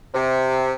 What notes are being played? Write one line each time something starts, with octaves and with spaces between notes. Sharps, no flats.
C3